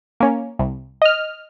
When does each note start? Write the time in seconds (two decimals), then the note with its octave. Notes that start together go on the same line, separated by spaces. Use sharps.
0.20 A#3 C#4
0.59 C2
1.02 D#5 F6